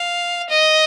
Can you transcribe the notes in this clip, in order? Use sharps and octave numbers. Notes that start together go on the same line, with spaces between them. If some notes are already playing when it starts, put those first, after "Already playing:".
Already playing: F5
D#5